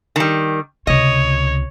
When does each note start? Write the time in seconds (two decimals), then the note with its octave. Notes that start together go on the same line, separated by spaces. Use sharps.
0.16 D#3 G3
0.87 C#2 C3 C#5 D#5